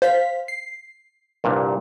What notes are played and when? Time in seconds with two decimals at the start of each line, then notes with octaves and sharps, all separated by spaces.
0.02 C5 F5 B6
0.48 C7
1.44 C2 G2 A#2